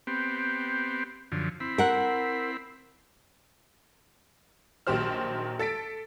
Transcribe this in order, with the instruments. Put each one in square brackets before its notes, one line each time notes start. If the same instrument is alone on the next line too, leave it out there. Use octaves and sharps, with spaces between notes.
[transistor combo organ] B3 C4 G4
F#2 D3 F3
C4 E4 B5
[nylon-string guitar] A#4 F#5
[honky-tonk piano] A#1 D#3 F#3 G4 C5 F6
A4 A6 B6 D7